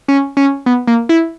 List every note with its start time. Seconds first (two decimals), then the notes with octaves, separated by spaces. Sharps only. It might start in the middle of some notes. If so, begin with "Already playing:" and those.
0.08 C#4
0.37 C#4
0.66 B3
0.87 A#3
1.09 E4